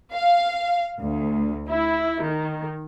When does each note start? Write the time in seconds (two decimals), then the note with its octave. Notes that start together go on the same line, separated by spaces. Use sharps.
0.15 F5
1.01 D2
1.68 E4
2.23 D#3